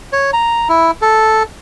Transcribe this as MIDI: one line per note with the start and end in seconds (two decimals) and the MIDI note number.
0.13 0.31 73
0.33 0.68 82
0.69 0.91 64
1.02 1.43 69